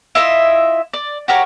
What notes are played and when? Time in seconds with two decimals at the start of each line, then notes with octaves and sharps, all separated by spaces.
0.15 E4 F4 D#5 E5
0.93 D5
1.28 F#4 G4 A#4 C#5